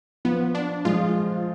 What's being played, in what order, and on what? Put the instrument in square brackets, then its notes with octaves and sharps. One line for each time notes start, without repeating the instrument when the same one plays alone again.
[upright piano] F3 [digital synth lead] B3
[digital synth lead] D4
[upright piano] F3 G#3 [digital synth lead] F4